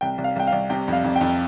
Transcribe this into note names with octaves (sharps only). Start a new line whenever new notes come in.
C2 G5
C2
F5
C2 G5
F5
C2
C3 G5
F2 F5
F2
G5
F2